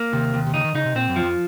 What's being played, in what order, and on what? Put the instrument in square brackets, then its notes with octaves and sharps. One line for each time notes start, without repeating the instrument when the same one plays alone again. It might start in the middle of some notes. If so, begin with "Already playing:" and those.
Already playing: [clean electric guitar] A#3
[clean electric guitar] D#2 [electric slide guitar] C3
[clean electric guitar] D#2
[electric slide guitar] C3
[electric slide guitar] C#3 [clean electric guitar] D#4
[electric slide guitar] D#3
[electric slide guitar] C#3 [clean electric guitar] D#4
[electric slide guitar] C3
[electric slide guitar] A#2 [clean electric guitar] C4
[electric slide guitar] F#2
[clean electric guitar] F3
[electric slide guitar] F2